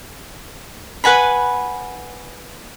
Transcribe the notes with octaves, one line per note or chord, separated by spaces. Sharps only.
B4 F#5 G#5 B5